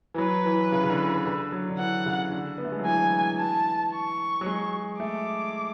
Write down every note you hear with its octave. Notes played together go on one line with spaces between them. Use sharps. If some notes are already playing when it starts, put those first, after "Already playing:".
E3
F#3 B4
E3
C#3
C#3
D3
E3
D3
F#3
D3
E3 F#5
C#3
D3
B3
A3
G#3
F#3
E3 G#5
A5
C#6
F#3
G#3
A3 D6